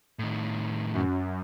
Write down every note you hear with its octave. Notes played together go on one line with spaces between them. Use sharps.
A2 D#3
F#2